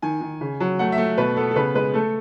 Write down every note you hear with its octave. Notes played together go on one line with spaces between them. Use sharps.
D#3 G#5
D#3
C#3
F#3
A3 F#5
E5
A3
B2 B4
B3 A4
A4
C#3 B4
G#3 B4
A3 A4